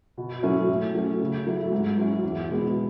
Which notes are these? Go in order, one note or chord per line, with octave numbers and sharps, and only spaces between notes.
B2
F#3 A3 C#4 E4
A2
F#3 A3 C#4
C#3
F#3 A3 E4
G#2
F#3 C#4 E4
E2
B2 G#3 B3